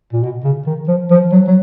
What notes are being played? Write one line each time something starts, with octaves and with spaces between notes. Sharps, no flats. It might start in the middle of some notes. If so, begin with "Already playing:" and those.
A#2
B2
C#3
D#3
F3
F3
F#3
F#3